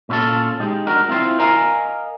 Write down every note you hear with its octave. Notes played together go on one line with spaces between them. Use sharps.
A#2 C#4 E4 F4 A4
G#3 D#4 G4
D4 F#4 A#4
C4 E4 F4 C5
A#4 D#5 F5 G#5 A#5